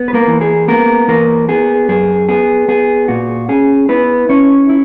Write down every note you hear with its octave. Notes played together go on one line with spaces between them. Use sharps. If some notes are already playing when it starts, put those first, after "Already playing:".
Already playing: B3
B4
A#3 A#4
E3
G#4
A#3 B3 A#4
E3 A#3 A#4
B3 G#4
F#2 G#4
B3 G#4
B3 G#4
A#2 F#4
C#4 G#4
B3 E4 B4
C#4 E4 C#5
E4